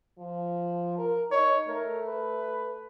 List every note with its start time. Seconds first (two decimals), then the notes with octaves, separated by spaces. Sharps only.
0.19 F3
0.98 A#4
1.32 D#4 C#5
1.68 A3 A#4
2.08 B4